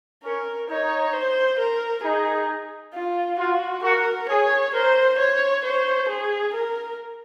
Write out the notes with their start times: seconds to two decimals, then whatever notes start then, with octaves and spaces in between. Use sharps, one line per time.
0.23 C#4 A#4
0.69 D#4 C#5
1.13 C5
1.59 A#4
2.03 D#4 G#4
2.94 F4
3.38 F4 F#4
3.83 F#4 A#4
4.29 G#4 C#5
4.73 A#4 C5
5.18 C5 C#5
5.63 C5 C#5
6.09 G#4
6.54 A#4